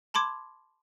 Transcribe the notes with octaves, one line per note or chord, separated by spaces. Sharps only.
A5 B5 C6 D6 G#6